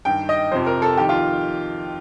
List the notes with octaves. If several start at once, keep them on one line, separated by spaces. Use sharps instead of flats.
G2 D#3 G5
D#5
F2 C3 F3 C5
A#4
A4
F2 D#3 G4
F4